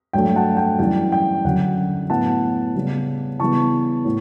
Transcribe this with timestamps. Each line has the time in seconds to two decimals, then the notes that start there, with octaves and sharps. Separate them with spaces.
0.13 G2 F#3 A3 G5
0.36 F#5 A5
0.57 G5
0.79 F#2 E3 G3 G5
1.12 G5
1.45 F#2 D3 F#3 F#5
2.09 A2 F#3 B3 F#5 A5
2.75 C#3 G3 B3
3.40 C#3 E3 G3 B3 A5 C#6
4.05 A2